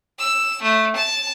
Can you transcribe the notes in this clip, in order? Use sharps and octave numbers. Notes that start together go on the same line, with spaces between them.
E6
A3
A5